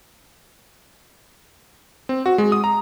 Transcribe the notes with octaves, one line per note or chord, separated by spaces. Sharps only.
C4
F#4
G#3
D#6
A#5